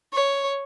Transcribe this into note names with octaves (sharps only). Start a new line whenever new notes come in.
C#5